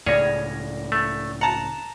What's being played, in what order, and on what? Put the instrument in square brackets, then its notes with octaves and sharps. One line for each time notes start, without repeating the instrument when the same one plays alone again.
[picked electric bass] C#2 A2 C#3 [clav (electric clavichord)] C#4 G#4 C#5 [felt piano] D5 A#6
[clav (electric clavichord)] A3
[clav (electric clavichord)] F#5 [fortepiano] A5 A#5